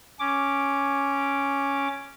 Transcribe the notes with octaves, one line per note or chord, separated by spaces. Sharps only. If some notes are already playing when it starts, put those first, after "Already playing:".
C#4 D6